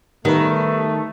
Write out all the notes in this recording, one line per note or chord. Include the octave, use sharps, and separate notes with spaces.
D#3 G3 A3 B3 B4